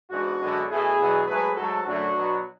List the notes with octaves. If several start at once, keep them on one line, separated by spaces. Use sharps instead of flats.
G#2 E3 B3 D4 F#4
F#2 D3 G#3 B3
B2 A3 E4 G#4
E2 B2 F#3 B3
G#2 F#3 A3 G#4 B4
G#2 F#3 A3 F#4 A4
F#2 D3 F#3 A3 D4 F#4
B2 F#3 B3